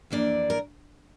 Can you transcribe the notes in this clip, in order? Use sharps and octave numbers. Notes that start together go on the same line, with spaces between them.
F2 E3 A#3 D4 D5
A#4